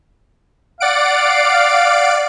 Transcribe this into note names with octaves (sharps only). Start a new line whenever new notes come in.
D5 F5 F#5 D7